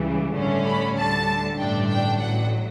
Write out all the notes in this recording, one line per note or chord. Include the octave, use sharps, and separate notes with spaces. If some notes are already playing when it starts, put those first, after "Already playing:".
Already playing: C#2 C#3 E3 G3
A1 G2 D3 A3 C#4
B5
D2 D3 G3 A5
A1 G2 D3 A3 D4 G5
G5
A1 A2 F#3 F#5